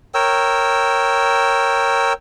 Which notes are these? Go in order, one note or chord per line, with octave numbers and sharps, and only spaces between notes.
A#4 C#5 G5 E6